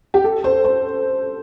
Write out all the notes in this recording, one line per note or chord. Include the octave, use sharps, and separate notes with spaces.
G4
A4
C5
C5